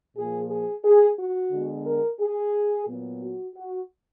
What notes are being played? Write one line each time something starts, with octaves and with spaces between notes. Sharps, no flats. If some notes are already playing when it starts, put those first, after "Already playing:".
A#2 F3 A#3 G#4
G#4
G#4
F#4
D3 G#3 B3
A#4
G#4
A#2 F#3 B3
F#4
F#4